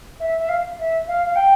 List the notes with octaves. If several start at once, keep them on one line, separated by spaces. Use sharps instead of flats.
E5
E5
F5
E5
F5
F5
G5